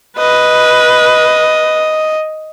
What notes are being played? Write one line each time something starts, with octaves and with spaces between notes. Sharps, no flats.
B4 D#5